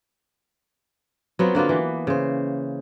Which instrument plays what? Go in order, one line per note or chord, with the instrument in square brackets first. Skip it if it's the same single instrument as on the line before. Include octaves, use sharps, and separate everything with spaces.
[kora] F#3 B3 C4 F4
D3 A#3 B3 F4
E3
C#3 C5